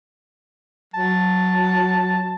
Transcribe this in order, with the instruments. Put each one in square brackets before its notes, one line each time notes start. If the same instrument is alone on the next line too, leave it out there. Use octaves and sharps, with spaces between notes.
[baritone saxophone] F#3 [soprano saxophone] A5